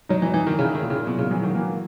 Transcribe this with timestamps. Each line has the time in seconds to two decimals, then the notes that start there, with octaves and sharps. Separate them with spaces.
0.09 F#3 D#4
0.22 E3
0.34 E3 D#4
0.47 D#3
0.59 C#3 E4
0.75 D#3
0.83 A#2
0.90 C#3
1.07 B2 F#3
1.18 C#3
1.31 E3 F#3
1.43 D#3
1.55 E3 A#3